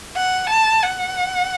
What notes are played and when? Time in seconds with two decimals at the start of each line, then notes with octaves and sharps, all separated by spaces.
0.16 F#5
0.50 A5
0.83 F#5